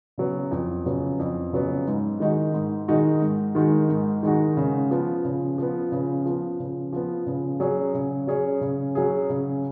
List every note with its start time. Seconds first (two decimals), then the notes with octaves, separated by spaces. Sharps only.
0.18 C#3 F#3 B3
0.51 F2
0.86 C#3 F#3 B3
1.19 F2
1.53 C#3 F#3 B3
1.87 G#2
2.20 D#3 G#3 D#4 F#4
2.54 G#2
2.88 D#3 G#3 D#4 F#4
3.22 G#2
3.55 D#3 G#3 D#4 F#4
3.89 G#2
4.23 D#3 G#3 D#4 F#4
4.57 C#3
4.91 F3 B3
5.25 C#3
5.58 F3 B3
5.92 C#3
6.26 F3 B3
6.60 C#3
6.93 F3 B3
7.27 C#3
7.60 F#3 C#4 G#4
7.94 C#3
8.27 F#3 C#4 G#4
8.61 C#3
8.95 F#3 C#4 G#4
9.30 C#3